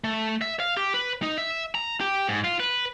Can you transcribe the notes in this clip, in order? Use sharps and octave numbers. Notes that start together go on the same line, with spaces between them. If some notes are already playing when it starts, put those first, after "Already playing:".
A3
E5
F5
G4
B4
D#4
E5
A#5
G4
G#2
F4
B4